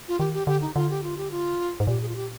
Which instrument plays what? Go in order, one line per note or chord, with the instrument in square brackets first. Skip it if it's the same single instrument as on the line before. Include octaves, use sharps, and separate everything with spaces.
[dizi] F4
[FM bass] D#3 [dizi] G4
[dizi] G4
[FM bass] D3 [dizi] G4
[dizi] D#4
[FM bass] D3 [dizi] F4
[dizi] G4
F4
G4
F4
[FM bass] G#2
[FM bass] A#2 [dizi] G4
[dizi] G#4
F4
G4